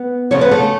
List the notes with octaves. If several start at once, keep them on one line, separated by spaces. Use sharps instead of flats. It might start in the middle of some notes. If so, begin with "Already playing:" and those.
Already playing: B3 B4
D2 C#3 F3 C#4 C#5
B3 B4
A3 A4